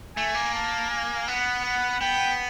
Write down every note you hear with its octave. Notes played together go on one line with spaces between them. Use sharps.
A3 G#5
A#3
A5
G#5
B3 F#5
F#5
B3 G5